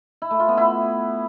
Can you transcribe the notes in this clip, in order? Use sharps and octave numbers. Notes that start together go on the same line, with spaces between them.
E4
A3
F4
B3
E4